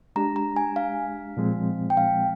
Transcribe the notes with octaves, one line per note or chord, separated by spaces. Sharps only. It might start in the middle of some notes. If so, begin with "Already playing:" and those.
G#3 D4 G4 A#5
A#5
G#5
F5
A#2 F3 G#3 C4
G5
F5